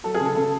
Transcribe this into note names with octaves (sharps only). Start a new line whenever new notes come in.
F#3 A4
G#4
C#3
A4
C#3 A4